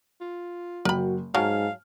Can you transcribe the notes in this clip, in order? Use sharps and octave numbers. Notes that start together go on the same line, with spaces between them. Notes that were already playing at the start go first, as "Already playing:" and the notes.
F4
F#1 F#4 A#4 G5 B5
G#2 F#3 F5 G#5 A5 F6